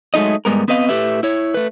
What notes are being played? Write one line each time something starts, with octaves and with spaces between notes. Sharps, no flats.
F#3 G#3 A3 D#4 D#5
G#2 G3 G#3 B3 A#4
B3 C4 B4 D#5 F5
A2 A3 G4 B4 E5
E4 C#5
A3 B4